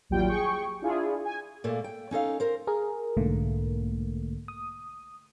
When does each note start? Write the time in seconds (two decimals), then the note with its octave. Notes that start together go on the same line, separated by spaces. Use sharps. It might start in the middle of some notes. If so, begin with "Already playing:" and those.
0.10 A1 D#2 F#3 G3 F4 G5
0.29 G#4 G5 C#6
0.82 D4 E4 F4 G#4
1.25 G#5
1.64 A#2 A3 A#3
1.84 G5
2.11 C#4 D#4 A4 F5
2.40 A#4 C5
2.67 G#4 A#4
3.17 B1 G#2 D3 A3 A#3
4.48 D#6